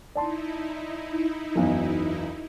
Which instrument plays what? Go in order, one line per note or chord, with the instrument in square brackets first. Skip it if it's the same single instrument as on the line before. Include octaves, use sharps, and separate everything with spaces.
[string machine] D#4 E4 [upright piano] D5 A5 C6
[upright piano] E1 B1 F#2